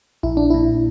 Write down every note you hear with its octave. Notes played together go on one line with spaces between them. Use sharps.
A#1 E4
D4
A#2 E4